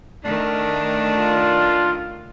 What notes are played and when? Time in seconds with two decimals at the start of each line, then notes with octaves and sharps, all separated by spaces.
0.25 D#3 A3 D4 A#4
1.17 F4